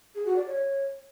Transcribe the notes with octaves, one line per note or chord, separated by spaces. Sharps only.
G#4
F#4
D5
C#5